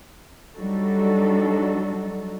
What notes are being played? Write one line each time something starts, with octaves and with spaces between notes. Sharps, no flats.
F#3 G3 D4 D#4 F#4 A4